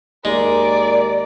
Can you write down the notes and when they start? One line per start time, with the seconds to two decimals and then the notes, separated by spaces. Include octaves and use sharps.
0.25 D#2 G#3 A#4 D5 A#5